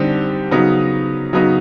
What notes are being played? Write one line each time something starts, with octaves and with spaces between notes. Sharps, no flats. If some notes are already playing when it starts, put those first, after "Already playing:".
Already playing: D3 G3 C4 D#4 G4
C#3 F#3 B3 D#4
C#3 F#3 B3 D#4